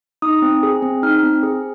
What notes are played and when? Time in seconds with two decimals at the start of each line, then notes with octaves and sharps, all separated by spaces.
0.22 D#4 D#6
0.42 C4
0.63 G#4
0.82 C4
1.03 D#4 F6
1.23 C4
1.43 G#4